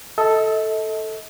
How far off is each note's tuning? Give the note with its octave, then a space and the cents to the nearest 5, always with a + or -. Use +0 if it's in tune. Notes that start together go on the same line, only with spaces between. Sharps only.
A4 +0 D#5 +40